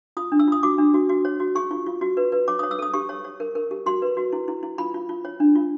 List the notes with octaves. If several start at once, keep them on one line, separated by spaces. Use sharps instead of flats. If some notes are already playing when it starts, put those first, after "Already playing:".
F4 D#6
D4
E6
F4 D#6
F#4 D6
D4
F#4
F#4
C#5
F#4
G#4 C#6
F4
F4
F#4
B4
B4
C#5 D6
D#6
C#5
E6
A4 D#6
G4 C#6
C#5
C#5
A#4
A#4
G4
F#4 C6
B4
F#4
E4
E4
E4
F4 B5
F4
F4
C#5
D4
F4